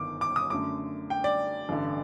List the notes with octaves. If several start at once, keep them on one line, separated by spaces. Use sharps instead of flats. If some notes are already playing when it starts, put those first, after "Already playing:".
Already playing: G1 F#2 D#3 D6
D6
D#6
F#2 D3 A3 D6
G5
D5
A1 G2 D3